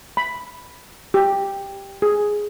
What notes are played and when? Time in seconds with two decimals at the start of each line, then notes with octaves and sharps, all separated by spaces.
0.17 B5
1.14 G4
2.02 G#4